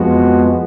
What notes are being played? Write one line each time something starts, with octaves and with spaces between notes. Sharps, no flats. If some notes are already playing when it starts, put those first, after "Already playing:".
Already playing: F2 F3 G#3 B3 F#4